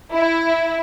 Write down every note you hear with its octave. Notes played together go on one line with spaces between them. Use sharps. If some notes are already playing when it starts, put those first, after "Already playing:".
E4